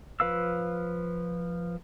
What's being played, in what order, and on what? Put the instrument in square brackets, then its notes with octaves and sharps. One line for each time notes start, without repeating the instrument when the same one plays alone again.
[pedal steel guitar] F3 B4 F5 E6